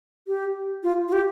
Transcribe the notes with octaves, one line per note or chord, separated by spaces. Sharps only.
G4
F4
F4
G4